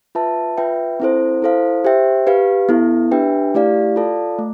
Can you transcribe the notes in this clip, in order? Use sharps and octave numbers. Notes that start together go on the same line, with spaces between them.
F4 B4 E5 A5
F4 B4 E5 G5
C4 E4 A4 C5
E4 A4 C5 F5
G4 C5 E5 G5
G4 B4 F5
B3 E4 A4
D4 G4 B4 E5 G5
A3 E4 G4 D5 F5
F4 A4 D5 F5 A5
A3